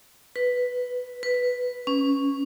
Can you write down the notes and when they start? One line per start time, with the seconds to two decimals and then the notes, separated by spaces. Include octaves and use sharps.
0.36 B4
1.23 B4
1.87 C#4